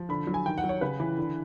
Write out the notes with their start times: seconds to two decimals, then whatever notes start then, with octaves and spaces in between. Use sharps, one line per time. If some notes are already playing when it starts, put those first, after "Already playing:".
Already playing: F3
0.09 D3 B5
0.27 F#3
0.34 G#5
0.46 D#3 G5
0.58 F#5
0.64 F#3
0.69 C#5
0.81 C#3 B4
1.00 E3
1.18 D3